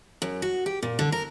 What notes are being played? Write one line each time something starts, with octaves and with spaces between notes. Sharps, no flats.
F#2
F#4
G4
A#2
D3
A#4